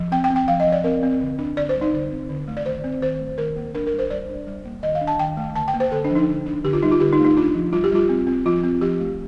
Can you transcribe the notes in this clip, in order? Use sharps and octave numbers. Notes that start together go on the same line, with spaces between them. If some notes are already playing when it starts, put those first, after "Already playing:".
Already playing: F3
C4 G5
G5
C4
G5
F3 F5
D#5
F3
D5
C4 A#4
C4
D3
D4
D3 D5
C5
G3
D#4
D3
C4
D3
A3
D5
D#3 C5
C4
D#3 C5
A3
D#3 A#4
A#3
D4 A#4
A#4
G3
C5
G3 D5
D4
G3
A#3
D#3 D#5
F5
D4
A5
D#3 G5
A3
D3 A5
G5
A#3
C5
D3 A4
D4
F3
D#4
D3
D4
D3 G4
F4
G3 D#4
F4
D3 G4
D#4
A3
D#4
D4 F4
F3
G3 F4
G4
G3 F4
C4
C4
F3 F4
C4
F3 G4
A3